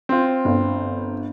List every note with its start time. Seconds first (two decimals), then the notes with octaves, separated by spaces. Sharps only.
0.09 C4 F4
0.45 G1